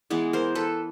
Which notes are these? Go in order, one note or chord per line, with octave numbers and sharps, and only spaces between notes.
E3 G#3 B3
A#4 C5
A4 B4